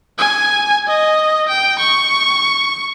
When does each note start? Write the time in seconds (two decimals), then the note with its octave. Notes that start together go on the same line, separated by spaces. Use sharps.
0.18 G#5
0.88 D#5
1.49 G5
1.79 C#6